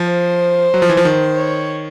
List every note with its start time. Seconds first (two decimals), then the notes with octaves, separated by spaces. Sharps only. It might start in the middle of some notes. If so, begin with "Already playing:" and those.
Already playing: F3
0.11 C5
0.74 F#3
0.82 F3
0.90 E3
0.97 F3
1.05 D#3
1.36 C#5